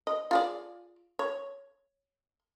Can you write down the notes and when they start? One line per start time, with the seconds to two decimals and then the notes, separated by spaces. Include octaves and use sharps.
0.07 D#5
0.31 F4 G#4 D5
1.19 C#5